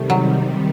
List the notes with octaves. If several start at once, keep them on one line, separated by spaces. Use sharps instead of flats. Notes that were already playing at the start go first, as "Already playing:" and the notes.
Already playing: C3 D#3 G3 A3
F#3